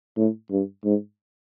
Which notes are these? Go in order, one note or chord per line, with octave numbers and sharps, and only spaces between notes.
A2
G2
G#2